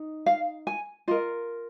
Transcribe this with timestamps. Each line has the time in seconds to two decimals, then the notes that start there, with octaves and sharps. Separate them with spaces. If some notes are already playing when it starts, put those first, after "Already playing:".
Already playing: D#4
0.26 F5
0.67 G#5
1.08 F4 D#5
1.11 A#4